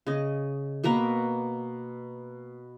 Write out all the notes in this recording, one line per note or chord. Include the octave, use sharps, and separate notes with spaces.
C#3 D#5
B2 A#3 B4 A#5